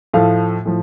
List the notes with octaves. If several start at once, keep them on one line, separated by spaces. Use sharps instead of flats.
A2 F3 A3 F5
A2 F3